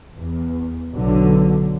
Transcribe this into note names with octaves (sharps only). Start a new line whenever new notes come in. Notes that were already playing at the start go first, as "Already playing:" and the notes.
E2
B1 D3 F#3